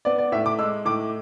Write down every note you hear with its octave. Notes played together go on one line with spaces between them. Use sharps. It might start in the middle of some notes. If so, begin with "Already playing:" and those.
B3 D5
D5
A2 E5
D6
G#3 E6
A2 D6